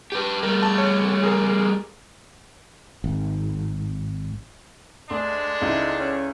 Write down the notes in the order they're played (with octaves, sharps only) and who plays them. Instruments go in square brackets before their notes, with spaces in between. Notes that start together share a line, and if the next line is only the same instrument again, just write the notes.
[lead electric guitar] G4 B4
[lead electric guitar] G3 A3 [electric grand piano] A#4
[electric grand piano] A5
C#5
G#4 A#4
[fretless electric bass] G#1
[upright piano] D2 [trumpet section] G#3 D4 [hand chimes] A4 D5 C6
[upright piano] C#2 E4 [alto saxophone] D#4
[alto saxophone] C#4